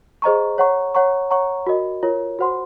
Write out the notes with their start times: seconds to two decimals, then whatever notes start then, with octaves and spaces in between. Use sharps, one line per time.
0.22 G#4 C5 D#5 A#5 C#6
0.58 C#5 F#5 A#5 C#6
0.95 C#5 F#5 A#5 C#6
1.31 C#5 F#5 A#5 C#6
1.67 F#4 A#4 D#5
2.03 F4 A#4 C#5
2.39 F#4 C5 F#5 C6